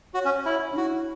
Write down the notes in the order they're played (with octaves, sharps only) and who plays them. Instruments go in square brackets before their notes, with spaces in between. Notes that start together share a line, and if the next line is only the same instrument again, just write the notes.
[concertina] F#4 [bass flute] C#5
[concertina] C#4
[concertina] E4 [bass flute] C#5
[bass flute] D4
[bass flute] E4 [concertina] F#4